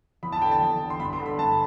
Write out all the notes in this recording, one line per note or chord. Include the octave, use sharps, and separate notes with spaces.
E2 B5
A5
D3 G5
A5
E2
D3
C6
G2 B5
C6
D3
B5
G2 A5